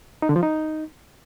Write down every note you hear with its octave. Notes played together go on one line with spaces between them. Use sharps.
D#4
D3
F3
D#4